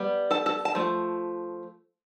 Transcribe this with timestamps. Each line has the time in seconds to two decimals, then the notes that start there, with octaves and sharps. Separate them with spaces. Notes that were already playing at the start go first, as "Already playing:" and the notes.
Already playing: G3 B3
0.31 A4 A5
0.46 A4 A5
0.65 A5
0.75 F3 A3